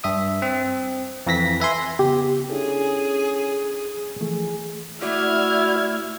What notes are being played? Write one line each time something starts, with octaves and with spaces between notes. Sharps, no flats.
G2 E5 D#6
C4
F2 E3 A#6 B6
B4 E5 G#5 C6
C#3 B3 G4
C#4 D4 E4 G#4 A4
E3 F3 A3 G#4
A3 E4 F#4 D5 F6 G#6